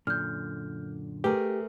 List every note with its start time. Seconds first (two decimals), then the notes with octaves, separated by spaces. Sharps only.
0.07 F#2 A#2 D3 F6 G6
1.24 A3 G4 G#4 A#4 B4